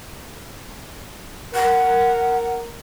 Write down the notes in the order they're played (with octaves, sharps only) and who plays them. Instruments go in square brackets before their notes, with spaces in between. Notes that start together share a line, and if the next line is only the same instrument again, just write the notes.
[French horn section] A#4 [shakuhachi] F#5